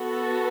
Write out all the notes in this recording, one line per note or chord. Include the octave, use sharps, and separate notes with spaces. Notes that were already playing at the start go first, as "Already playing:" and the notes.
Already playing: B3 F#4 A4